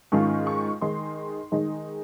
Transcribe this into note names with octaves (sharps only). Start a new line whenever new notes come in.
G#2 D#3 G#3 C#4 F4 C#6
C#6
D#3 G#3 D#4 C6
D#3 G#3 D#4